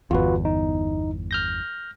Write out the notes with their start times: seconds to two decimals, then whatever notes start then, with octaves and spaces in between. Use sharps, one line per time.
0.11 G1 E2 F4 F#4 B4
0.45 D#4
1.31 F6 G6 A#6